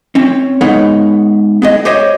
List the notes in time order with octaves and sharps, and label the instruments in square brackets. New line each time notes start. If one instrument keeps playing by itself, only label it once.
[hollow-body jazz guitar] C4 C#4
G#3 B3 D#4 A#4 C#5 F#5
B3 G#4 D#5
G4 C5 C#5 D#5